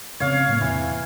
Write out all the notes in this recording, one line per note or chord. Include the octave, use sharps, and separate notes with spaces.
F1 C#3 C4 C#5 F5
A2 G#3 A#3
E2 C3 E3